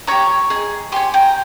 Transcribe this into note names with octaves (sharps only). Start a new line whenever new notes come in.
G4 C#5 A#5 C#6
G#4 D#5
G4 C#5 G#5 C6
G5 A#5